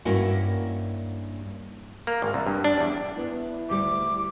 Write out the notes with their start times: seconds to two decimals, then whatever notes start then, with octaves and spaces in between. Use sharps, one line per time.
0.05 G2 A#3 C#4 E4 F#4
2.07 A#3
2.22 G#1
2.34 C2
2.46 G2
2.64 D4
2.80 E2
3.17 B3 E4
3.70 D2 G3 D6